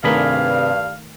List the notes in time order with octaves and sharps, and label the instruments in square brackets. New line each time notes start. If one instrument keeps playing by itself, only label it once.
[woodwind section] G2 [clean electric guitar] C3 G#4 B5 [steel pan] D#3 A3 A#4 [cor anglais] F5